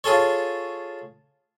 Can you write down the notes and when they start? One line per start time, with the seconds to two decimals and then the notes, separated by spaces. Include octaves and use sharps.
0.04 F4 G#4 A4 C#5